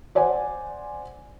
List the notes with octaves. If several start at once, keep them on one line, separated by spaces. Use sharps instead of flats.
C5 D5 F#5 G#5